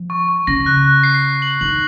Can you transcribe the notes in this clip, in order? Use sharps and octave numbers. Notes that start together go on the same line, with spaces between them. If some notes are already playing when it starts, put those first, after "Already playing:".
Already playing: F3
C#6
C#6
C#3 A#6
F#6
F#6
C7
C7
F#7
D#3 F#7